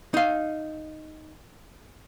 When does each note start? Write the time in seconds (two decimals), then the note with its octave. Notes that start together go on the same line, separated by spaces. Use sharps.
0.14 D#4 F5